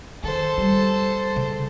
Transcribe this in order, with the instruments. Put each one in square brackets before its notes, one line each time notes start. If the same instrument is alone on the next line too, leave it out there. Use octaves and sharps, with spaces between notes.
[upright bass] D#3 [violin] A4 C5
[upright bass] G3
C#3